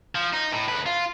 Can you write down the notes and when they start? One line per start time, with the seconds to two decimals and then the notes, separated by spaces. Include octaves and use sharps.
0.15 F3
0.33 D#4
0.52 A2
0.68 D2 B4
0.86 F4